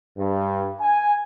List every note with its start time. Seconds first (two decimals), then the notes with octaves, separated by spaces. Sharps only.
0.18 G2
0.80 G#5